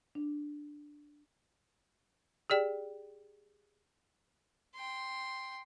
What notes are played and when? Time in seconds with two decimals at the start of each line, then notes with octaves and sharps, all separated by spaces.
0.15 D4
2.50 G4 G#4 D5 G5
4.74 G5 C6